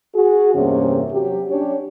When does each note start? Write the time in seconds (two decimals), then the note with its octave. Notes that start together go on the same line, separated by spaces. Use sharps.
0.14 F#4 G#4
0.55 E2 G2 C3 A#3 C#4
1.12 F#3 G4
1.50 C#4 D4 G4 C#5